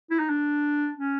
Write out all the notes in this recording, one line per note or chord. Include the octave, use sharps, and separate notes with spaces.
E4
D#4
D4
C#4